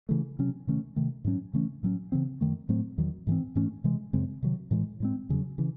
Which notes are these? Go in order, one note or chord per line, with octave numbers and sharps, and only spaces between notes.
C#3 E3 A3
C3 F#3 C#4
C3 D#3 A3 C#4
C3 D#3 A3
G#2 F#3 C#4
C#3 E3 A3 C#4
A2 F#3 C#4
C#3 E3 C4
F#2 D#3 A3
A2 F#3 A3 C4
E2 D#3 F#3
G#2 E3 C4
G#2 E3 A3 C#4
C3 E3 G#3
F#2 C#3 G#3 C4
C3 D#3 F#3
A2 E3 G#3
A2 G#3 C4
E2 C#3 F#3
C#3 E3